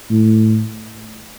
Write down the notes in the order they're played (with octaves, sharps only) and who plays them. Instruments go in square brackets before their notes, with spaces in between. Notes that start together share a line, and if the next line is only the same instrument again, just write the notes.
[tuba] A2